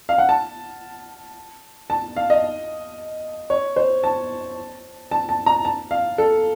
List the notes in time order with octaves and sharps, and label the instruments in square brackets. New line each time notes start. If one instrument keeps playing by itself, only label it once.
[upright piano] F5
F#5
A5
A5
F5
D#5
C#5
C5
A5
A5
A5
A#5
A5
F5
A4